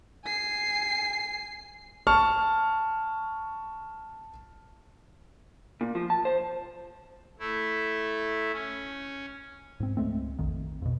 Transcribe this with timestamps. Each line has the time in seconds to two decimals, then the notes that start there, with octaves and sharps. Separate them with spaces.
0.25 G#5 C7
2.07 A5 C#6 F6
5.81 A#2
5.95 F3
6.10 A5
6.25 C5
7.39 A3 E4
8.52 C#4
9.80 G#2 C4
9.97 C#2 G#3 A3 C4
10.39 A#1 F2 D#3
10.82 F2 B2